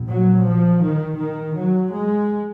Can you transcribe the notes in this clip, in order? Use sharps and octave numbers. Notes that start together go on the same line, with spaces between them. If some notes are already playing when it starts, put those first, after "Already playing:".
Already playing: A#1 A#2
F#3
F3
D#3
D#3
F#3
G#3